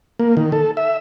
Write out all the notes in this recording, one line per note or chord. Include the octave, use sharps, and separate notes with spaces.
A#3
D#3
A4
E5